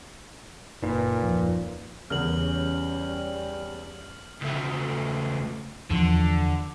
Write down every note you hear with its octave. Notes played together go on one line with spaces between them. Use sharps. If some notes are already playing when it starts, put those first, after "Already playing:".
F#1 A#2 D#4 B4
D#1 F#2 F3
E2 C#3 G3 C#4 A#4 F6 F#7
C#2 A3
E2 D3 F3